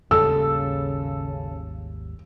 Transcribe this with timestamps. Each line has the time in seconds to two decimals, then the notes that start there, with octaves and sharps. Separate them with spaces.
0.11 G#1 D#2 C#3 G3 A4 E6